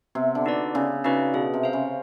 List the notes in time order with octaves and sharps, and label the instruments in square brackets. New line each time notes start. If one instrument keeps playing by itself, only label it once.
[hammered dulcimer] C3 [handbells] B3
[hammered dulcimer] D3
[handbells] D#4 F#4 B4 D5
[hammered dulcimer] C#3 [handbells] B3
[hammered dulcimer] C#3 [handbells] D#4 F#4 B4 D5
[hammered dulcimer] B2 [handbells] G#4
[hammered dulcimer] C3
[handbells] C5 F5
[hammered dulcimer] C#3